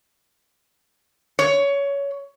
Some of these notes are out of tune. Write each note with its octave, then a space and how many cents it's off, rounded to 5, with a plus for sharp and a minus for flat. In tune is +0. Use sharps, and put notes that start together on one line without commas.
C#5 +20